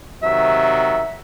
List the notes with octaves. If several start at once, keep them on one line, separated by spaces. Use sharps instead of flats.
C3 D#3 F#3 E5